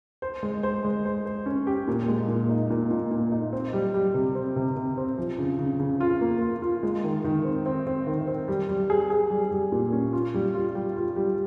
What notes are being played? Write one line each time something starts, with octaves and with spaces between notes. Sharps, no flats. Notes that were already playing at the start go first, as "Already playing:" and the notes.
C5
G#3
C5
G#3
C5
C5
C#4
G4
A#2
G#3
A#2
D#4
A#2
A#2
A#2
D#4
C4
G3
G3
C3
C4
C3
C3
C4
F3
C#3
C#3
C#3
F4
A#3
F4
F4
G#3
D#3
D#3
C4
C4
C4
D#3
C4
G3
G3
G#4
G#4
G3
G3
A#2
C#4
F4
G3
F4
G3
F4
G3